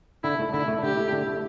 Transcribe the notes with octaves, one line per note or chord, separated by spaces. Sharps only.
D3 E4
A3 E4
D3 E4
A3 E4
D3 G4
A3 E4
D3
A3 E4